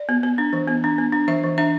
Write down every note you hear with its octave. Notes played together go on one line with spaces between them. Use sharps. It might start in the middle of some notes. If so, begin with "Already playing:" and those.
Already playing: D5
B3
B3
D4
E3
B3
D4
B3
D4
E3 E5
E3
D4 E5